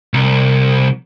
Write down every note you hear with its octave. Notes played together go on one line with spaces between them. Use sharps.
C2